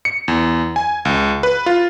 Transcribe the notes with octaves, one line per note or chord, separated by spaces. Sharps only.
C#7
E2
G#5
C#2
B4
F4